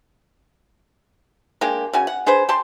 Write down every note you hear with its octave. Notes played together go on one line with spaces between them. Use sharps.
G#3 A#3 D4 G4
C#3 F#4 G#5
F#5
D4 G#4 B4 C5
G4 A5 C6